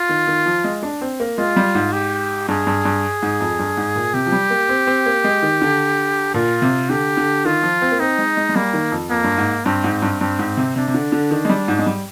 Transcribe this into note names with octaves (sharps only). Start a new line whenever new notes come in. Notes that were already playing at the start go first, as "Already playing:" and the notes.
Already playing: F4
D#3
D#3
F3
G#3
D4
C4
A#3
G#3 F4
G3
G#2
G4
G2 G#4
G2
G2
G#2
F2
G2
G#2
A#2
C3 G4
F3
G3
A#3
C4
C4
A#3
G#3
D#3
D3
A#2 F4
C3
D3 G4
D3
D#3 F4
F3
C4
A#3
C4 D#4
G#3
G#3
G#3
G3 A#3
D#3
F2
F2 A#3
G2
G#2
G2 C4
G#2
G2
G2 C4
G#2
C3
C3 D4
C3
D3
D3
D#3 D4
G#3
G3
G#2
G#3
G3